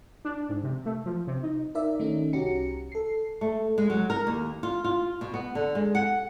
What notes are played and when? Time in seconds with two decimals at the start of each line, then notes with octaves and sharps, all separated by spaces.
0.25 D4
0.49 G#2
0.63 C3
0.86 A3
1.06 F3
1.27 C3
1.43 D#4
1.75 D#4 A#4 D5 E5
2.00 D#3 A3 C#4 D#4
2.33 C2 C#4 F#4 G4 A#5 C#7
2.92 A4 C7
3.41 A3
3.78 G#3
3.90 F#3
4.10 A#4
4.27 D#2
4.63 F4
4.84 F4
5.21 B2
5.34 B3
5.55 D3
5.75 G#3
5.95 F#5